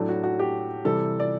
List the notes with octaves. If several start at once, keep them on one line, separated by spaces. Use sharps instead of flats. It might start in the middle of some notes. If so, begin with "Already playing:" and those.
Already playing: A2 F#3 A3 D4
F#4
F#4
G4
C3 E3 G3 A4
D5